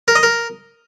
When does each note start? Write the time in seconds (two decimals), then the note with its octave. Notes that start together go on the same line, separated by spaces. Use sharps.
0.08 A#4
0.15 D#5
0.23 A#4